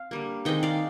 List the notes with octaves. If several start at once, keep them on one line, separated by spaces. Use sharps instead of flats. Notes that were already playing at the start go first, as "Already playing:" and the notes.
Already playing: C4 F5
D3 G3 A#3
D#3 G#3 C4 D#5 G5
D5 F5